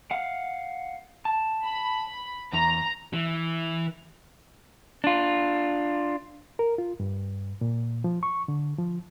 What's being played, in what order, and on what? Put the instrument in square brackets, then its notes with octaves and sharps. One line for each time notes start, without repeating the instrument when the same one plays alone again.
[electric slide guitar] F5 F#5
A5
[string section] B5
[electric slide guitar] E2 [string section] A#5
[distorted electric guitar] E3
[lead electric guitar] D4 F4
[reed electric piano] A#4
F4
G2
A#2
F3
C#6
D3
F3